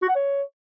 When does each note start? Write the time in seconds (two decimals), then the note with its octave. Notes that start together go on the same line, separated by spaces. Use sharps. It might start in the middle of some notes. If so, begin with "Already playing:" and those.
0.02 F#4
0.08 F#5
0.15 C#5